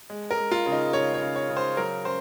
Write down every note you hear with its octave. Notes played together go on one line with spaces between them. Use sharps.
G#3
A#4
G#3
F4
C#3
D#4
C#3 C#5
C#5
C#3
C#5
C#3
C5
F#3 A#4
C#3 C5